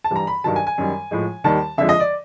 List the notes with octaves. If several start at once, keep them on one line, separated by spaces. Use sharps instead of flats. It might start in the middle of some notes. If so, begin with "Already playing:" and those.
A5
G2 E3 G3 A#5
B5
G2 D#3 F#3 A5
G#5
G#5
F#2 D#3 G3
A2 F3 G#3
D#2 D#3 G3 A5
F2 D3 F3 G#3 E5
D#5
D5